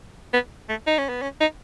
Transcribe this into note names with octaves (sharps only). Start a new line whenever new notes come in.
B3
A3
D#4
C#4
B3
C#4
D#4